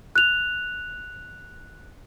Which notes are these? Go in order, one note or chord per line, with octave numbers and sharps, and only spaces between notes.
F#6 F7